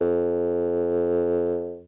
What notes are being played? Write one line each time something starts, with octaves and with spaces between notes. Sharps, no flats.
F2